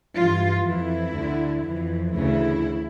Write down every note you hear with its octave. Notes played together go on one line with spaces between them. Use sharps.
G2 E3 F4
F2 E3 E4
D2 D3
F2 E3
D2 C#3 E3 E4